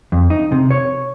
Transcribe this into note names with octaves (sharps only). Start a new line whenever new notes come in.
F2
D#4
C3
C#5